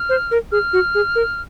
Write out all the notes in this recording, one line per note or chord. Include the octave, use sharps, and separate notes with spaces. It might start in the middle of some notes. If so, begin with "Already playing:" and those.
Already playing: F6
C5
A#4
G#4 F6
F#4
G#4
A#4